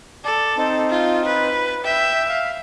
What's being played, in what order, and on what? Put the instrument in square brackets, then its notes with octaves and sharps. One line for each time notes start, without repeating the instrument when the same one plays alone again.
[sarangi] A4 [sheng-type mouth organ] D5
[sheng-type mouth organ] C4 D#4
[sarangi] F4
B4
[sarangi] E5 [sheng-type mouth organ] G5 G6
[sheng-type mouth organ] F5